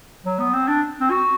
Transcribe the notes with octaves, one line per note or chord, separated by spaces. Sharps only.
F#3
B3
C4
D4
C4
F#4